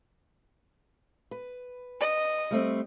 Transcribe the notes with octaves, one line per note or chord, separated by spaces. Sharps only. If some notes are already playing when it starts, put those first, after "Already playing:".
B4
D#5
G3 A3 C4